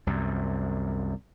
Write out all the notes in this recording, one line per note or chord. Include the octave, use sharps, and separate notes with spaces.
C2 F#2